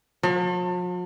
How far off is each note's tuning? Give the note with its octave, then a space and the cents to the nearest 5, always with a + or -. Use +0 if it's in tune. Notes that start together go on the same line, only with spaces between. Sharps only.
F3 +45